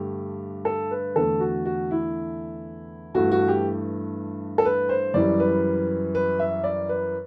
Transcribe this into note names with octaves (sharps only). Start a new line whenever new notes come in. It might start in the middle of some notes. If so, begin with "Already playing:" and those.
Already playing: G2 D3 A3 G4
A4
B4
E2 D3 A3 A4
F#4
F#4
E4
G2 E3 A3 F#4
F#4
G4
A4
B4
C5
F#2 E3 G3 D5
B4
B4
E5
D5
B4